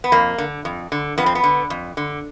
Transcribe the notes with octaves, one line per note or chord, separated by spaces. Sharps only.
B3
F2 A#3
D3
F2
D3
F2 B3
C4
B3
D3
F2
D3